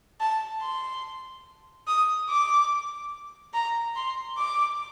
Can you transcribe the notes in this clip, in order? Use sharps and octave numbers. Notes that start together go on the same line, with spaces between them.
A5
C6
D#6
D6
A#5
C6
D6